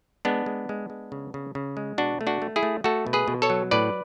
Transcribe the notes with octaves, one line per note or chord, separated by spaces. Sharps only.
G#3 B3 D4
G#3
G#3
G#3
C#3
C#3
C#3
G#3
B2 D4 F#4
A3
D4 F#4
A3
E4 G#4
A3
A3 F#4 A4
B2
G#4 B4
B2
A4 C#5
F#3
A2 B4 D5